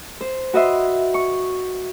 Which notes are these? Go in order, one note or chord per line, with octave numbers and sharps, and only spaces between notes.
C5
F#4 B4 D#5 E5 C6
C#6